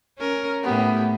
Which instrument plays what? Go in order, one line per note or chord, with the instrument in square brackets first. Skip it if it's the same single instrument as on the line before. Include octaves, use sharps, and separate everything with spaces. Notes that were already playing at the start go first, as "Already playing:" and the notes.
[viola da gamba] C#4 A#4
[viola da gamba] A2 G4 [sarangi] B3